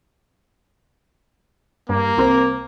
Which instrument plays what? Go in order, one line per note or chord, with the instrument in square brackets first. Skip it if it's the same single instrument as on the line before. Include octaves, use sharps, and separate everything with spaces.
[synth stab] G2 [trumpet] A#3
[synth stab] C2 C4 A#4